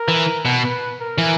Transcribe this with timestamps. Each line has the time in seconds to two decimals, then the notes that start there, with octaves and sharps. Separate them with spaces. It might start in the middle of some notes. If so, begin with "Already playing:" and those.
Already playing: A#4
0.08 E3
0.45 B2
0.64 B4
1.00 A#4
1.18 E3